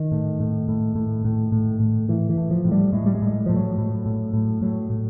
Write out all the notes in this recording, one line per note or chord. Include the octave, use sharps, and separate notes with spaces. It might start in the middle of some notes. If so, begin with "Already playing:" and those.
Already playing: D#3
A2
A2
A2
A2
A2
A2
A2
A2 E3
E3
A2
F3
A2
G3
A2 G#3
G3
G#3
A2
A2 F3
F#3
A2
A2
A2
A2 F#3
A2